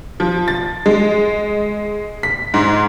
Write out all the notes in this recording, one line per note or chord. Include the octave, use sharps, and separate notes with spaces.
F3
A6
G#3
B6
G#2